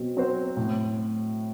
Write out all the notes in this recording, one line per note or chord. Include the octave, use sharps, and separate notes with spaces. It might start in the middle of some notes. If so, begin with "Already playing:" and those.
Already playing: B2 F#3 C4
F#3 C4 F#4 C5
A2